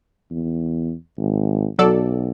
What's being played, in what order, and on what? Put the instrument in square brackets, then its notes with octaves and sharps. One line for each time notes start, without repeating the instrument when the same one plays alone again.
[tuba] E2
G#1
[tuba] B1 [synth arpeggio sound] F#3 A4 D5